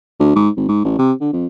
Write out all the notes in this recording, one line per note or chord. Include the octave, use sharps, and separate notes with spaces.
D2
G#2
G#1
G#2
A1
C3
D3
F2